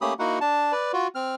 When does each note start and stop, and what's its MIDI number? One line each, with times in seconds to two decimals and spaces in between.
0.01 0.13 57
0.01 0.13 58
0.01 0.13 61
0.01 0.13 67
0.01 0.13 83
0.01 0.13 87
0.19 0.39 58
0.19 0.39 63
0.19 0.39 64
0.19 0.39 66
0.19 0.39 78
0.41 0.72 62
0.41 0.72 81
0.72 0.92 71
0.72 0.92 74
0.93 1.07 65
0.93 1.07 66
1.15 1.35 60
1.15 1.35 89